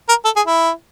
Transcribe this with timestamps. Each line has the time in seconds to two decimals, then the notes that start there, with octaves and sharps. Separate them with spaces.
0.09 A#4
0.25 A4
0.36 G#4
0.47 E4